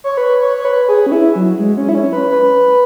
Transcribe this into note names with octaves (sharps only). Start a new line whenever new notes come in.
C#5
B4
C#5
C#5
B4
G#4
C#4
E4
F#3
G#3
C#4
E4
C#4
B4
B4